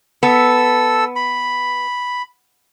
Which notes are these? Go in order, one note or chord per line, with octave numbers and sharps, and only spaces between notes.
B3 A4 E6
B5